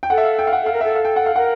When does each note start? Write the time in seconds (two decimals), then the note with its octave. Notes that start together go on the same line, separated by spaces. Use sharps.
0.03 G5
0.10 A4 F#5
0.18 E5
0.24 F5
0.39 G5
0.47 F5
0.53 F#5
0.63 A4 F5
0.73 A#4
0.81 A4 E5
0.95 F5
1.05 G5
1.16 F#5
1.26 F5
1.36 A#4 F#5